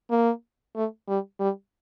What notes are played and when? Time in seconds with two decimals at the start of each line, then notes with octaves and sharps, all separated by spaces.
0.11 A#3
0.76 A3
1.08 G3
1.40 G3